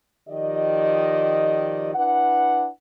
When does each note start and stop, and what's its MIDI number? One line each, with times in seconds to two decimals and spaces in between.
0.29 1.95 51
0.29 1.95 53
0.29 1.95 67
0.29 1.95 74
0.29 1.95 75
1.95 2.68 62
1.95 2.68 64
1.95 2.68 71
1.95 2.68 78